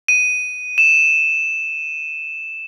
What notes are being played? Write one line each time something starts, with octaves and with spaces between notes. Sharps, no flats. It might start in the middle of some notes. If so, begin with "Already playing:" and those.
D#7
E7